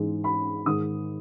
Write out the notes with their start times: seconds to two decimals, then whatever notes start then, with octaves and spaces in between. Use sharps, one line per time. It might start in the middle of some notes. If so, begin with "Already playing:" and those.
Already playing: G#2 E3 G#3
0.24 B5
0.66 G#2 D#3 G#3 D#6